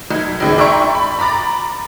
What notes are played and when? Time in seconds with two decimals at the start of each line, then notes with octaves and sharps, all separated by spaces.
0.11 B1 G#6
0.40 G#1 C#2 G#2
0.58 D5 E5 G5 A#5 C6 C#6
0.95 B5
1.19 A#5 B5 D6 A6